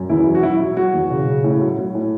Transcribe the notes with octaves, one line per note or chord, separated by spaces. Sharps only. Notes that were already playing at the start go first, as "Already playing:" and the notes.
Already playing: F#2
E2 E4
F#3
F#4
F#3 E4
F#3
F#3 F#4
E2
C#3
C#3
A2
F#3
F#3
A2